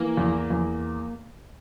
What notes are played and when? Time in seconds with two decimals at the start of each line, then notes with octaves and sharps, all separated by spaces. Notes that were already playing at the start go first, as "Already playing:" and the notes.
Already playing: E3 A#3
0.17 E2
0.50 E2